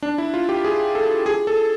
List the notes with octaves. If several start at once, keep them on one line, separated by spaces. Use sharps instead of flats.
D4
E4
F4
G4
G#4
A4
G#4
A4